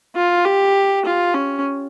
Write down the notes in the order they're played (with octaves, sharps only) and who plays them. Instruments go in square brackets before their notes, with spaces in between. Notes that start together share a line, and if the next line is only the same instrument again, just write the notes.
[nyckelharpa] F4
G4
F4
C#4